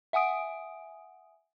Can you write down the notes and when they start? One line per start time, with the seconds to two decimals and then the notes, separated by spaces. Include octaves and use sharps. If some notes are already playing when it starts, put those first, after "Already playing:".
0.13 E5 F#5 G#5 D#6 D7